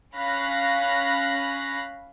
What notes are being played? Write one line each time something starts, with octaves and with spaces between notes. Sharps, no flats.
C#4 F5 B5 F#6 A#6